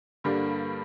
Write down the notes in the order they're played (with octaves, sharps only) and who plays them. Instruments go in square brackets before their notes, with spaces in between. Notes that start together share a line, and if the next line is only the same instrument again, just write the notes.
[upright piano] G2 D3 G3 A#3 D4